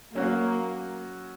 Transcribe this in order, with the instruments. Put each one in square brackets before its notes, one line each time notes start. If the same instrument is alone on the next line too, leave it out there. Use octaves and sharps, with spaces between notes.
[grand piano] F#3 C#4 F#4 [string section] A#3